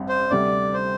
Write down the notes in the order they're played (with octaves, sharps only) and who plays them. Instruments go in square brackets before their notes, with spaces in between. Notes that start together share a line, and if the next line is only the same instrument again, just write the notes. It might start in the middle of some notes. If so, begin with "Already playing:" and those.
Already playing: [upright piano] A1 G2 C4
[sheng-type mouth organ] C5
[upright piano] D2 C3 G3 [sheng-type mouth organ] D5
[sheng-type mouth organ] C5